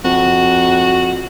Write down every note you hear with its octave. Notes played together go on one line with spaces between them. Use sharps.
F2 F#4